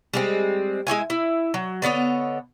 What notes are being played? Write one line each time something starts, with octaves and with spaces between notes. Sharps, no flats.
G3 G#3 C4
G#3 C#4 E4 G#5
E4
F#3
D3 B3 C#5 D#5